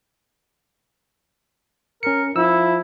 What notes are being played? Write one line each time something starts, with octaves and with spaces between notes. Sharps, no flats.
C#4 A#4 C#7
F3 E4 E6